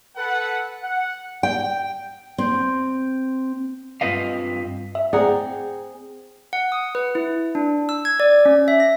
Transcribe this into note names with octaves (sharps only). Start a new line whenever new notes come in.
A4 B4 F#5
F#5
G5
C4
G2 C4 F4 B4 D#5 F5
E5
C4 G#4 D5 F#5 A#5
F#5
D#6
B4
E4
D4
E6
G#6
D5
C#4
E5
A#6